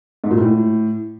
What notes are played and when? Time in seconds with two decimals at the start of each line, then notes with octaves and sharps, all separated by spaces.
0.24 G#2
0.31 A#2
0.38 A2